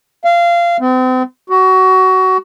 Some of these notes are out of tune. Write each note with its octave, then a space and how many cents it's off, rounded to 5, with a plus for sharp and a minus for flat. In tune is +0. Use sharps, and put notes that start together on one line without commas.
F5 -20
C4 -40
F#4 +20